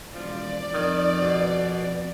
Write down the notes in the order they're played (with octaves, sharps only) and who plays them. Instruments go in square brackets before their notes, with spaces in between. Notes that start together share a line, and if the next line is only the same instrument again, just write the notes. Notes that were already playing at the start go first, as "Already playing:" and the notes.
[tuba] E1 [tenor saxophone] F3 [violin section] D5
[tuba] F2 [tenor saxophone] D#3
[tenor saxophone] B2